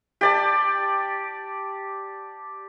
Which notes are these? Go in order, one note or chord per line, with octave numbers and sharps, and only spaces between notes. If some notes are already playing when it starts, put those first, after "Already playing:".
G4 D5 A5